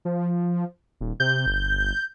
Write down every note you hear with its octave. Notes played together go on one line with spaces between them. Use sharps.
F3
D#1
C3 G6
G1